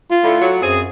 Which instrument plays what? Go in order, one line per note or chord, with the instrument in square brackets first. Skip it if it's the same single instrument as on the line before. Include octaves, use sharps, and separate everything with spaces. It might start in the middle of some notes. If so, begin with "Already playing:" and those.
[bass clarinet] F4
[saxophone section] A2 D3 A3
F#3
[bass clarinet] F#2 [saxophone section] C4 G#4